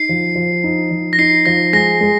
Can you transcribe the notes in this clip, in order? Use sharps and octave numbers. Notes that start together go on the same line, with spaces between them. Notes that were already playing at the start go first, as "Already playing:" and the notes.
Already playing: D#4 C7
F3
F3
D#4
F3
A#6
D#4 C7
F3 A#6
G#3 A#6
G#3